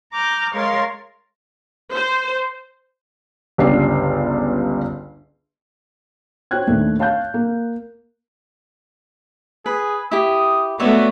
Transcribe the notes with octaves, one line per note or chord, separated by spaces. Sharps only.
A#5 D6 F6 G6
G#3 A#4 C#5 F5 C6 A6
C5
G1 C#2 D4 G4 C7
F#4 C5 C#5 G5 F#6 G#6
D#2 A#2 A3 D4
C#5 F5 A5 F#6 G6
A#3
G#4 B4
E4 G4 D#6
A3 B3 F#4 C#5 D5 E5